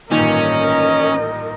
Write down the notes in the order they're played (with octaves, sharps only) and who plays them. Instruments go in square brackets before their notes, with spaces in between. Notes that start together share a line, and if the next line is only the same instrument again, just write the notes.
[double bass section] A1 G2 [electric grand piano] A#2 D#3 D#4 [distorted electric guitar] C#4 [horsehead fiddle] A#4 D#5